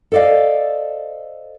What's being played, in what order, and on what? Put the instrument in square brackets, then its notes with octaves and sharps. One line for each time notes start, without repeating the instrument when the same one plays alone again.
[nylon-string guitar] A4 C5 D5 D#5 F5